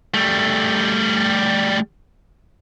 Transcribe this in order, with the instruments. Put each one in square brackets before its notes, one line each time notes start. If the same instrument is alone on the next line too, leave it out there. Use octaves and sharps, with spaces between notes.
[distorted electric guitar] G3 A3